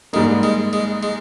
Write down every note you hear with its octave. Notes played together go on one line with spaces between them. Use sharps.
G#2 G3 G#3 A#3
G#3
G#3
G#3